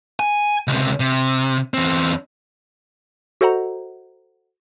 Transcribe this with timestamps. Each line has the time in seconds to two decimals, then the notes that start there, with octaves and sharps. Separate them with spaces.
0.20 G#5
0.68 C#2 C3
1.00 C3
1.74 E2 C4
3.41 F#4 A4 C5 D#5 F#5 A#5